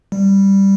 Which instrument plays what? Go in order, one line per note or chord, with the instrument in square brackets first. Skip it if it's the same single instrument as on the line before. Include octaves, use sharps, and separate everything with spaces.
[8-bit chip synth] G3